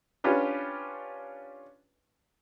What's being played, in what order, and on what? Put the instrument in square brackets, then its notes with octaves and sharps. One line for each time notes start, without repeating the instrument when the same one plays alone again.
[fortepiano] C#4 D4 F4 G4 B4